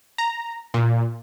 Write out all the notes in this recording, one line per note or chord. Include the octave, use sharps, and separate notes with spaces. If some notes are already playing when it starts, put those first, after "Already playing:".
A#5
A#2